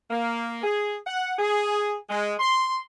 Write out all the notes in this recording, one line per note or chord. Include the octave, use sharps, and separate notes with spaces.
A#3
G#4
F#5
G#4
G#3
C6